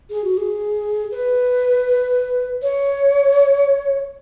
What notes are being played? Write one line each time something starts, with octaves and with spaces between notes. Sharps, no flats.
G#4
F#4
G#4
B4
C#5